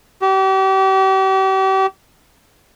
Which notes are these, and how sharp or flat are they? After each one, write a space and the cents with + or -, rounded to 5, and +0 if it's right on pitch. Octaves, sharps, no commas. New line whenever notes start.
G4 -40